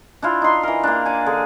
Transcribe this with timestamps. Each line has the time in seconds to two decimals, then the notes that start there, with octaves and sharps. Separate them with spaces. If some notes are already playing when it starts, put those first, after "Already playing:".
0.22 D4 E4 F4
0.42 D#4 C6
0.63 E3 A#4
0.84 A#3 D4
1.05 D5 F#5 G#5
1.26 D3 G#4